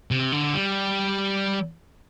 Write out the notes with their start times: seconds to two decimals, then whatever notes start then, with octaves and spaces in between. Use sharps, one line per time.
0.11 C3
0.32 D3
0.54 G3